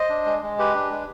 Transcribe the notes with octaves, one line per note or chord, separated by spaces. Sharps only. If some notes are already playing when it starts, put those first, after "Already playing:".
Already playing: C5 D#5
D4
G#3
G#3
G4 B4
D4
G#3